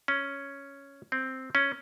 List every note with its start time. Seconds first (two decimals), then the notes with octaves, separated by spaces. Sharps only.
0.08 C#4
1.12 C4
1.55 C#4